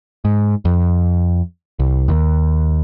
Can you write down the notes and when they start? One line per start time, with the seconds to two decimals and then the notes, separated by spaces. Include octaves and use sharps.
0.25 G#2
0.65 F2
1.79 C2
2.08 D#2